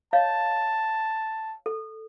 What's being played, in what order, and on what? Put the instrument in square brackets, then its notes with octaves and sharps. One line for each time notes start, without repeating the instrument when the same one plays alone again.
[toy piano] C#5 D#5 F5 [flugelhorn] A5
[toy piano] A4